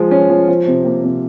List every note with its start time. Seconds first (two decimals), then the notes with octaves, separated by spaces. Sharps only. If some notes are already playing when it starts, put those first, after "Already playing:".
Already playing: F3 G#3 F4
0.11 C#4
0.30 F3
0.49 F3
0.67 C3
0.85 A#3
1.04 C3